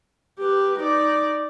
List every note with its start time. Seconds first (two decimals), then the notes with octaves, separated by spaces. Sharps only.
0.40 G4 B4
0.79 D#4 D5